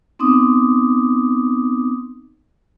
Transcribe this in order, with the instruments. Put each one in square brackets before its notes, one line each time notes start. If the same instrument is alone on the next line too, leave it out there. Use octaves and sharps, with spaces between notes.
[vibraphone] B3 C4 D#4 D6 D#6